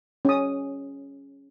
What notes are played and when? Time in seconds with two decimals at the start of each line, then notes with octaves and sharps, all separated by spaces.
0.25 C#4 D#6